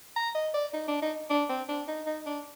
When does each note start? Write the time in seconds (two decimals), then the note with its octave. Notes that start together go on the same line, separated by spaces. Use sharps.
0.16 A#5
0.35 D#5
0.54 D5
0.73 D#4
0.88 D4
1.02 D#4
1.30 D4
1.49 C4
1.68 D4
1.88 D#4
2.06 D#4
2.26 D4